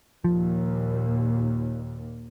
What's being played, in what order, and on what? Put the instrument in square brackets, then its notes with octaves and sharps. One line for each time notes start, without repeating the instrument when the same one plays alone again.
[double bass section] D#2 A#2 [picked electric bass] F3